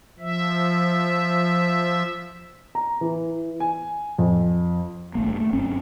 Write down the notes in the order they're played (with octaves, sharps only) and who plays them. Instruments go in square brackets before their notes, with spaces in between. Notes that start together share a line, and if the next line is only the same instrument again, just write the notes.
[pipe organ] F3 E5
[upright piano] A#5
E3
G#5
F2
[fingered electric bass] G#1 A3 A#3
G2
A3
G1 F#2 C4 C#4